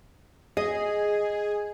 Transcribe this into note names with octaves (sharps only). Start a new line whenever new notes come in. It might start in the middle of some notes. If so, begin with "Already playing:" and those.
G#4 D#5